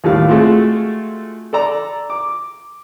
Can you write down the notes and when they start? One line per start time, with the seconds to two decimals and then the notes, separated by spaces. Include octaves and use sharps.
0.04 D#2 A2 G3 A4 F5
0.28 G#3 A3 C4 F4 F#4
1.53 A4 D5 A#5
2.10 D6